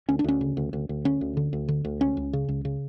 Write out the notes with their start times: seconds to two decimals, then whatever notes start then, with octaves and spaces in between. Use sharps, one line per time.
0.09 D2 C#4
0.19 D4
0.24 D2 C#4
0.41 C#3
0.57 D2
0.73 D2
0.89 D2
1.05 D3 C#4
1.21 D2
1.37 D3
1.53 D2
1.68 D3
1.85 D2
2.01 C#2 C#4
2.17 C#2
2.33 C#3
2.49 C#2
2.65 C#3